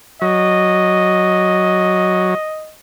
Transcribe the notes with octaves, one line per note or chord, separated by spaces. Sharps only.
F#3 D#5